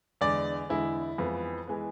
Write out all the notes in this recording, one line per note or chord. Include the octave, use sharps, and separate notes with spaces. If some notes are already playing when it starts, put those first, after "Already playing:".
E2 D3 G#3 D5
E2 D3 G#3 E4
F2 E3 G#3 B3
E3 G#3 B3